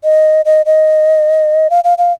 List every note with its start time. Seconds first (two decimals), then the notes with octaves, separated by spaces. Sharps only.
0.04 D#5
0.45 D#5
0.66 D#5
1.70 F5
1.84 F5
1.98 F5